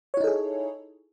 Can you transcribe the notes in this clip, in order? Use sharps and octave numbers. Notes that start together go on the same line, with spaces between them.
D#4 E4 G#4 A4 C#5